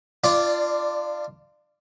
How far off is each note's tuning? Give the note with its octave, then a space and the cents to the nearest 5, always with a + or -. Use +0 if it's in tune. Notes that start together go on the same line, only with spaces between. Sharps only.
D4 +25 F4 -20 D5 +0